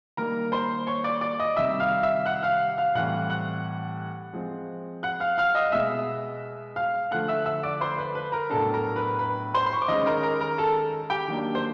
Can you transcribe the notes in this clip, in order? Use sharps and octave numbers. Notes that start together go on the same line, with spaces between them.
D#3 G3 A#3 A#4 A#5
C5 C6
C#5 C#6
D5 D6
D5 D6
D#5 D#6
C3 D#3 G3 E5 E6
F5 F6
E5 E6
F#5 F#6
F5 F6
F5 F6
A2 E3 G3 C4 F#5 F#6
F#5 F#6
F3 G#3 C4
F#5 F#6
F5 F6
F5 F6
D#5 D#6
B2 G#3 B3 E5 E6
F5 F6
D3 F3 A3 F#5 F#6
E5 E6
E5 E6
D5 D6
C5 C6
B4 B5
B4 B5
A#4 A#5
A2 F#3 B3 D4 A4 A5
A#4 A#5
B4 B5
B4 B5
C5 C6
C6
C#6
D6
D#3 G#3 C#4 D#5 D#6
A#4 A#5
A#4 A#5
A#4 A#5
A4 A5
G4 G5
D#3 F#3 A#3 D4
C5